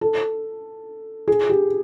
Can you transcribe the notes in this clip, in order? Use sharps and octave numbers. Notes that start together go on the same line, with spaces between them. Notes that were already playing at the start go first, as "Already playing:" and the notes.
A4
G#4
G4